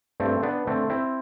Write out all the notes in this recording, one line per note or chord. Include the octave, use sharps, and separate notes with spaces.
G2 A3 C4
B3 D4
D3 A3 C4
C4 E4